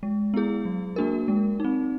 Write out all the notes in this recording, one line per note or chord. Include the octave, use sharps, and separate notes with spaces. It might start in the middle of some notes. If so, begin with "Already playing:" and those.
G#3
B3 E4 G#4
F#3
A#3 D4 F#4 A#4
G#3
C4 D#4